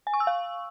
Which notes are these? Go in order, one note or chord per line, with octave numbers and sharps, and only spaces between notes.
G#5
C#6
E6
F5